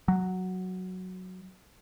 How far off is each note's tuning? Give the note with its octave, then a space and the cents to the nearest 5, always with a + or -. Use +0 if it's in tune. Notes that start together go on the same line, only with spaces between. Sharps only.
F#3 +0